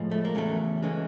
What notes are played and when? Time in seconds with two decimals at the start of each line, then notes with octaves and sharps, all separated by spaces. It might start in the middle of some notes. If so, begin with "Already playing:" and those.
Already playing: A2 F3 G#3
0.11 A3
0.25 A#3
0.35 E2 C#3 F#3 A3
0.82 C#3 E3 G#3